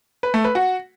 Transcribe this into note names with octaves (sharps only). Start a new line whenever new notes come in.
B4
A3
B4
F#4